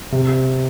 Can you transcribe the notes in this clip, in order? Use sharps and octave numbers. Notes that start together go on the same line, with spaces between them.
C3